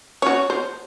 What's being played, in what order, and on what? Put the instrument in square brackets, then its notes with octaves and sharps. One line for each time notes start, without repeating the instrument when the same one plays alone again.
[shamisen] C#4 F#4 [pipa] C#5
[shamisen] C5